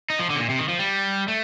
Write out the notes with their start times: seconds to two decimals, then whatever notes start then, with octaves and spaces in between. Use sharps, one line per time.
0.10 D#4
0.19 F3
0.30 D3
0.36 C3
0.40 A#2
0.49 C3
0.59 D#3
0.69 F3
0.79 G3
1.28 A3